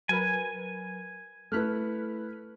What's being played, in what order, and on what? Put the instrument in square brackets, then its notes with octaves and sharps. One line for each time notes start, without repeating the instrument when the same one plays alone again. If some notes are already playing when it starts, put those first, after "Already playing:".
[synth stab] F#3 A#4 B4 [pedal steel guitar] G#5
[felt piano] A3 E4 B4 [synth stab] F6 F#6 B6